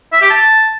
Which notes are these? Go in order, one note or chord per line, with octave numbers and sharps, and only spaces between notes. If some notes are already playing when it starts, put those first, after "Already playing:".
E5
G4
A5